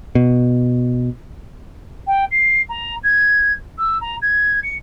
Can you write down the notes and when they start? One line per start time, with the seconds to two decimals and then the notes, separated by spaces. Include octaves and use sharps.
0.15 B2
2.07 G5
2.31 C7
2.69 A#5
3.03 G#6
3.78 E6
4.01 A#5
4.22 G#6
4.63 C#7